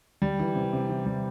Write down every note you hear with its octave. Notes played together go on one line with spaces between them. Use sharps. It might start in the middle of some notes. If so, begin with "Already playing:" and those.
G3
E3
C3
C3
E3
G3